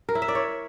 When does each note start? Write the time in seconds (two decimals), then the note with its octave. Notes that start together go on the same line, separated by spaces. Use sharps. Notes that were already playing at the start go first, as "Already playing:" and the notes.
0.09 A#4
0.15 E4
0.22 E5
0.28 D5
0.35 C#5